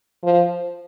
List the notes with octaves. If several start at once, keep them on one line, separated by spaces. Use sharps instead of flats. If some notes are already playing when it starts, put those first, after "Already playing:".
F3